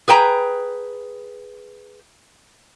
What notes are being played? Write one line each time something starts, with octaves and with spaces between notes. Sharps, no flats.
G#4 B4 G5 A5 A#5